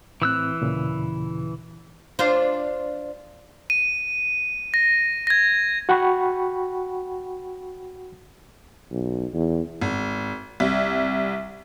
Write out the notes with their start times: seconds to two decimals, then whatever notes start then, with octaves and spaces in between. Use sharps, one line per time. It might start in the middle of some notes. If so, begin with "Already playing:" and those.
0.22 A2 E3 C4 E6 F#6
0.61 D#2 A#2 C#3
2.19 D4 F4 C5
3.70 D#7
4.74 A#6
5.27 G#6 A#6
5.89 F#4 F#5 G5 B5 C#6
8.91 B1
9.34 E2
9.82 G#1
10.60 C2